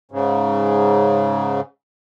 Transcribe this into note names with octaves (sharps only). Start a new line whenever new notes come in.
G#2 C#3